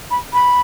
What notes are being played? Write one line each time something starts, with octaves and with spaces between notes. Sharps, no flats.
B5
B5